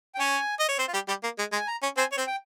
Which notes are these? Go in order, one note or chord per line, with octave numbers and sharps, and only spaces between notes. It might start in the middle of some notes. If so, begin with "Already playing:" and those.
G5
C#4 C#5 G#5
D#5
C#5
C4 C5
F4
G3 G4
G3 G4
A#3
G#3
G#3
G#5
A#5
C#4
C4 C5 G#5
C#5
C4 C5
G5